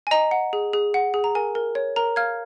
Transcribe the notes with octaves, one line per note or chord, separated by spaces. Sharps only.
G#5
D#5 A#5
F#5
G#4
G#4
F#5
G#4
A#5
A#4 G#5
A#4
C#5
A#4 A#5
F5 F6 G#6